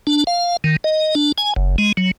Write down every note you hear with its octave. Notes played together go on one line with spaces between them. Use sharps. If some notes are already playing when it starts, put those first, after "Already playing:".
D4
F5
D#3
D#5
D4
G#5
F#1
G#3
F#3